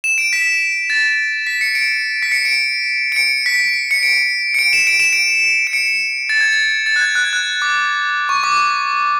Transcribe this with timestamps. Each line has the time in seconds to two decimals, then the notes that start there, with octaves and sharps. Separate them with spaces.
0.04 E7
0.18 D7
0.33 B6
0.90 A6
1.47 B6
1.61 C#7
1.75 D7
2.22 B6
2.32 C#7
2.45 D7
3.12 D7
3.16 C#7
3.46 B6
3.91 C#7
4.03 D7
4.54 C#7
4.59 D7
4.73 E7
4.87 D7
5.00 E7
5.13 D7
5.67 D7
5.73 C#7
6.29 A6
6.41 G#6
6.52 A6
6.86 A6
6.96 F#6
7.01 G#6
7.15 F#6
7.24 G#6
7.33 F#6
7.62 D6
8.29 C#6
8.43 D6